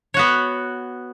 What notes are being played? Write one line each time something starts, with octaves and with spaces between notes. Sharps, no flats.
B3 F#4 C#5